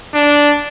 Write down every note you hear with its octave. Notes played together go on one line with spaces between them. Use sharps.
D4